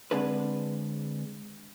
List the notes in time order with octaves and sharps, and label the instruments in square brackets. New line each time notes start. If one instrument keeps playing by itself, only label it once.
[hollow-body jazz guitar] D3 G#3 C4 D4 G#4 B4